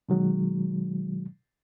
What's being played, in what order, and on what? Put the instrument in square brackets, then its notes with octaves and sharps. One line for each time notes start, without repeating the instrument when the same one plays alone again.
[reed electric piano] B2 D#3 F#3 G#3